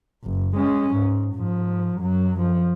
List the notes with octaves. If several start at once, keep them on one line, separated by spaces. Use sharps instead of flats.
F#1
G#3 C#4
G#2
G#2 F3
F#2 F#3
F3